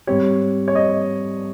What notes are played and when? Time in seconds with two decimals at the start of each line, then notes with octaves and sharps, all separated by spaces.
0.07 G#2 G3 C4 G4 C#5
0.68 C#5
0.75 D#5